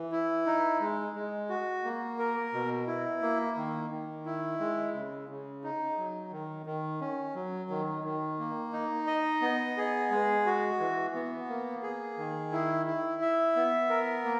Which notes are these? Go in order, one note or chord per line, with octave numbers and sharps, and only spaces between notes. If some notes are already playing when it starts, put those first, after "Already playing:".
Already playing: E3
E4
D#4
G#3
G#3
F#4
A#3
A#4
B2
E4
A#3
D#3
D#3
E4
G#3
C#3
C#3
D#4
F#3
D#3
D#3
C#4
F#3
D#3
D#3
A#3
D#4
D#5
B3
G#4
G#3
F#4
E3
B3
A#3
G#4
D#3
E4
E4
E5
B3
A#4
A#3